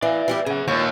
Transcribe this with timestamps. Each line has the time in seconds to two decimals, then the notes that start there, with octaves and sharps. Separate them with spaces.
0.02 E3 D5 F5
0.28 E3 G3 G4
0.46 C#3 G#4 F#5
0.68 D#2 A#2 F4 C#5